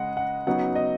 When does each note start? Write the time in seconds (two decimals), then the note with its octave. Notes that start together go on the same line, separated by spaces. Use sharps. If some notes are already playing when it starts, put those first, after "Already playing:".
Already playing: C#3 G#3 D#5 F#5
0.17 F#5
0.47 C#3 F#3 B3 D#4 F#5
0.76 D#5